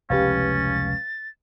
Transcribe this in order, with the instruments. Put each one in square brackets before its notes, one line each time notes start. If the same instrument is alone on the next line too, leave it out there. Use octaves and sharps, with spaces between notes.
[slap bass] F1 C#2 [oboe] C#4 [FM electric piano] G4 B4 F5 [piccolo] A6